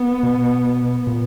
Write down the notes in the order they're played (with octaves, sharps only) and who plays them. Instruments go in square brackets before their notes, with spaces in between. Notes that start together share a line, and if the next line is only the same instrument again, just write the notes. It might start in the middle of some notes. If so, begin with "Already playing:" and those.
Already playing: [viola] B3
[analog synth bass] B2
A#2